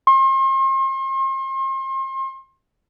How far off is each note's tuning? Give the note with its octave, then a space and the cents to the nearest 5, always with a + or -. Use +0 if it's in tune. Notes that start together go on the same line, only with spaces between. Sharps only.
C6 +40